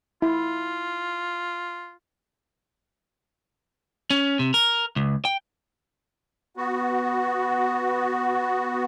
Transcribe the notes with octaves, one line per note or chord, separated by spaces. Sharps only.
E4 F4
C#4
C3
A#4
C#2
G5
B3 F#4